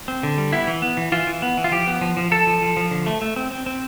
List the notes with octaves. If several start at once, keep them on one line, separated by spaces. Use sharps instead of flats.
C4
D3
G3
B3 E4
E3
B3
E3
E3 F4
E3
B3
E3
F4
F3 G4
B3
F3
F3
F3 A4
F3
F3
F3
D3
A3
A3
C4
C4
C4